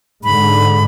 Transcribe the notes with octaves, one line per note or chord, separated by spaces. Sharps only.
G#2 D3 B5